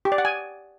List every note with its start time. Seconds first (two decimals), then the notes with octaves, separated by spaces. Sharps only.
0.05 G4
0.12 D5
0.18 F#5
0.25 G#5